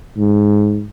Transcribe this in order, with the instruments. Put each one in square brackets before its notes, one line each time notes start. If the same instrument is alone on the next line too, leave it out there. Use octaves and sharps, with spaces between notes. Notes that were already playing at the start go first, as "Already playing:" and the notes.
[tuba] G#2